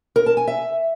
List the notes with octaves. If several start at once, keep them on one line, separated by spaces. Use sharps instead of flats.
A#4
A5
G#5
E5